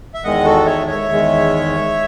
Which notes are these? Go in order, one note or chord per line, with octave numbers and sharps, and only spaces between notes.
E5
E2 D#3 G#3 D#5 F#5
F#4 A4
C#5 E5
C#5 E5
E2 D#3 G#3